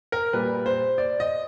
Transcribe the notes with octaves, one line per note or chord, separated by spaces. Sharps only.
A#4
A#2 G3 B4
C5
D5
D#5